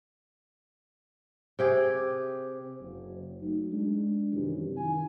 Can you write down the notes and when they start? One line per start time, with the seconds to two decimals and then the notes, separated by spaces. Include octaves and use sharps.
1.59 C3 G4 G#4
2.80 F#1
3.41 F#3 A3 D#4
3.72 G#3 D4
4.32 F#2 C3 D#3 E3 G3
4.78 D#3 E4 G#5